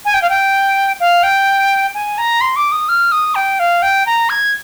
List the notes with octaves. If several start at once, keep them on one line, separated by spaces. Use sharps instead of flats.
G#5
G5
F5
G5
F5
G5
G#5
A#5
C6
D6
D#6
F6
D#6
G5
F5
G5
A#5
G#6